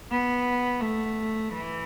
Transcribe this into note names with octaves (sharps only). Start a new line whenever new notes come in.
B3
A3
E3